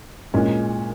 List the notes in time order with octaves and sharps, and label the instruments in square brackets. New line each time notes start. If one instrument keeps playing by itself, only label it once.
[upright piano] A#2 G#3 C#4